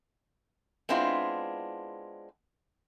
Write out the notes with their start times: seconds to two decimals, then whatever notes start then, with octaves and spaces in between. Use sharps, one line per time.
0.89 G#3 B3 C4 D4 E4 F4